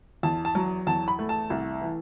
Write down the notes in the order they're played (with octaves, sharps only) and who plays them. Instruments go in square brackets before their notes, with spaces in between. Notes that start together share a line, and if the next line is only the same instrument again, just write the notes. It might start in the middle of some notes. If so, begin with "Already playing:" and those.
[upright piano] E2 A5
A5
F#3
E2 A5
B5
A3
A5
C2
E3